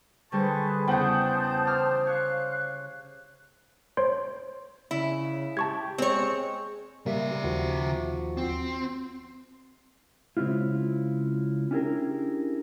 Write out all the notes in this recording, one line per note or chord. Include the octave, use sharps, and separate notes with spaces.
D3 G3 G#4 B4 C5 A5 C#6
E2 C#3 C5 F#5 G5 A5 D#6 G6
D6 F6
C#5 F5 F#6
C5 C#5 C6
C#3 E4
G4 A5 C#6 G#6
G#3 C4 C#5
C#3 G3 A#3 E5
D#2 F3 F#4
C4
C#3 G#3 C4 E4 F4
C#4 D4 E4 G4 G#4 A#4